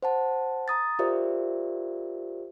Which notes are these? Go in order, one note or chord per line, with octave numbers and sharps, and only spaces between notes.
C5 F#5 A5
A#5 D#6 A6
F4 G4 A#4 C5 D5 E5